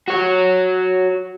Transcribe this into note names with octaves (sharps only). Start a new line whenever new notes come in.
F#4 C#5